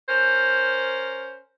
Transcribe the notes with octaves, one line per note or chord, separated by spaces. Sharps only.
C#4 A#4 C5